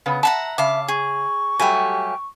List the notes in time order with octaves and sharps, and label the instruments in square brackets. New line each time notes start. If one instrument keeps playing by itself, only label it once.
[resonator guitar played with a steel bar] C#3 B3
[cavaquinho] E5 F#5 A#5 [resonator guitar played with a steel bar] A5
[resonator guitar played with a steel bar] C#3 [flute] E5 [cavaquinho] F5 A5 D6
[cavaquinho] G#4 [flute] C#6
[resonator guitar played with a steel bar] F#3 G3 A3 [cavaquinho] G4 G#5